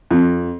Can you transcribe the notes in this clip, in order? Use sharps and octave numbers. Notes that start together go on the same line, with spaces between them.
F2